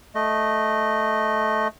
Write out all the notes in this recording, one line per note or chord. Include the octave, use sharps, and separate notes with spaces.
A3 D#5